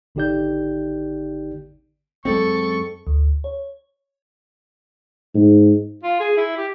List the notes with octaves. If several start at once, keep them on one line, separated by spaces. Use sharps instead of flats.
G#1 D3 D#4 G4 D5 G6
F#2 G#3 C4 A4 C#6
D2
C#5
G#2
F4
G#4
E4
G4